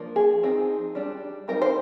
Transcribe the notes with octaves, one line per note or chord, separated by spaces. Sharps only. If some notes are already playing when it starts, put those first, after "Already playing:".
Already playing: F3 A#3 D4
G#4
F3 C4 D#4
G3 D4
G3 C4 D#4 A#4
C5